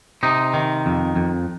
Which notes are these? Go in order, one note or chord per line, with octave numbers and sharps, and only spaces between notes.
C3 D#4
D#3
F2
F2